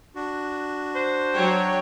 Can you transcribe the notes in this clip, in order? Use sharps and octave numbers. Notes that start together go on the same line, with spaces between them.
D4 F#4
C5
F#3 C#5 G5